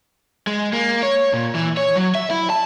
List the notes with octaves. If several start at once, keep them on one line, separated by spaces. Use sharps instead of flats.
G#3
A#3
C#5
A#2
E3
C#5
F#3
E5
E4
A5